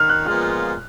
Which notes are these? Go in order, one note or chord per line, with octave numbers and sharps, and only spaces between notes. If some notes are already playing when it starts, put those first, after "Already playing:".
Already playing: D#3 F6
F#6
A#2 F3 G#3 B3 F4 F6